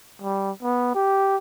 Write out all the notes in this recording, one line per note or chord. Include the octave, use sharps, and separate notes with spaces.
G3
B3
G4